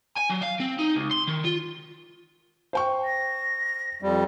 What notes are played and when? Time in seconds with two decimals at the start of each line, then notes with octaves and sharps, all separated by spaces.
0.17 G#5
0.29 F#3
0.41 F5
0.60 C4
0.79 D#4
0.95 C#2
1.11 C6
1.28 D#3
1.45 F4
2.73 C5 G5 C#6
3.05 A#6
4.02 F2 G3